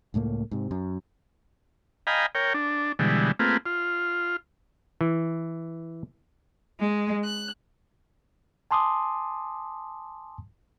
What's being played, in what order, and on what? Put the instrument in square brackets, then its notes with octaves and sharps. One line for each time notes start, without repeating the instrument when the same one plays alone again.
[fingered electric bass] C#2 A2 A3 A#3
G#2 C3
F#2
[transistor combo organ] D#5 F5 G5 G#5 A#5 B5
A#4 C#5 G5
D4
B2 D3 E3 G3 G#3
A3 A#3 C4 F4 G#4 B4
F4
[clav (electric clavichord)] E3
[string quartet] G#3
F#6
[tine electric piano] G#5 A5 C6 D6 D#6